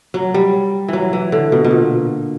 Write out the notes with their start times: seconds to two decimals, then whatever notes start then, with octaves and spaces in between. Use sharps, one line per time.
0.14 F#3
0.34 G3
0.88 E3 F#3
1.13 E3
1.32 D3
1.52 B2
1.64 B2
1.71 A#2